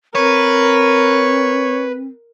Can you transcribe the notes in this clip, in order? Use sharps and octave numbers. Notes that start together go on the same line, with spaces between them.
C4 A#4 B4 C#5